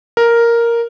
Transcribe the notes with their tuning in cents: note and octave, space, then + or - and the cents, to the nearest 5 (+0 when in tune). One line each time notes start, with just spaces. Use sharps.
A#4 +0